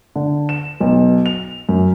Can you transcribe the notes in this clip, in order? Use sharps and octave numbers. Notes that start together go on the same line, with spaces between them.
D3
E7
B1
F7
F#2